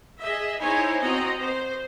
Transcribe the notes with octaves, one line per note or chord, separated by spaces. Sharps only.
G#4 D#5 E5
D#4 E4 C5 C#5 G#5 A#5
C4 F#4 D#5 A#5
C5